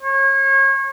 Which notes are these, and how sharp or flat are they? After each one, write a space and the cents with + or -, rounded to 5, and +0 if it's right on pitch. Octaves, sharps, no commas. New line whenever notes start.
C#5 -30